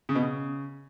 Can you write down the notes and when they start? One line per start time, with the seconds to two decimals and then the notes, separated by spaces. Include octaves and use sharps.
0.09 C#3
0.15 B2
0.22 C#3